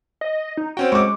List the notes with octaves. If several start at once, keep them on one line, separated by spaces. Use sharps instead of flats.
D#5
D#4
C4 C#4 F#4 G5
G#3 C#6 D6